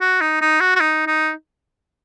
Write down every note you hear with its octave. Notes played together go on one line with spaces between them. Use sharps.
F#4
D#4
D#4
F#4
F#4
D#4
D#4